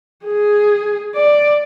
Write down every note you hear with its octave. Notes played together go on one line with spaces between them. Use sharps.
G#4
D5